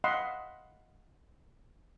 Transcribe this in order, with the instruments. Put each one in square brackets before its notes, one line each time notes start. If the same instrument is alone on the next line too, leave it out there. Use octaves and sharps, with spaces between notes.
[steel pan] D#5 F5 F#5 B5 C6